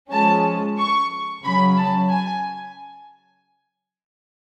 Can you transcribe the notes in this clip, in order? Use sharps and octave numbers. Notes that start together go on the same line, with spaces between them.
F3 G#3 C#4 A5
C#6
C#3 F#3 C#4 B5
A5
G#5